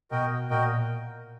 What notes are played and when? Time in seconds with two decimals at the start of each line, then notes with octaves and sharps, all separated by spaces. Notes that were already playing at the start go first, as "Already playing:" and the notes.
0.11 B2 F#4 A#4 D#5 G5
0.50 A#2 F#4 A#4 D#5 G5